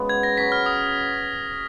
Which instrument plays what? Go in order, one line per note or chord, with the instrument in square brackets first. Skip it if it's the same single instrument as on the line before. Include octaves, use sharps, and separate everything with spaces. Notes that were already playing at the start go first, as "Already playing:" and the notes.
Already playing: [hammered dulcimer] C#3 G#3 B3 F#4
[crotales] G#6
A#6
[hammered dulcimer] F#3 C#4 G#4 B4 [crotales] B6
[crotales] F6
D#6